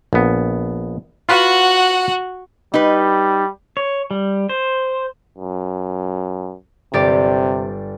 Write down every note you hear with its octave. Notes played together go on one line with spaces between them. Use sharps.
A#1 B3
F4 F#4 B4 F#5
G3 D#4 B4
C#5
G3
C5
F#2
G1 C3 G4 D5